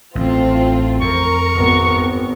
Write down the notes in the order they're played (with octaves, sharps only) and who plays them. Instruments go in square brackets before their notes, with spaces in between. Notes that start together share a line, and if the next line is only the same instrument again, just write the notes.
[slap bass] A1 [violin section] A3 C4 F4
[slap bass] F2 [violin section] A#4 [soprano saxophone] C#6
[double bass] G#1 B3